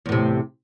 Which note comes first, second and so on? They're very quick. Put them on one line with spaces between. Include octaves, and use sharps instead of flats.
E2 A2 C3